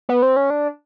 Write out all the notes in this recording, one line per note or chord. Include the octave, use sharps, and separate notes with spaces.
B3
C4
C#4
D4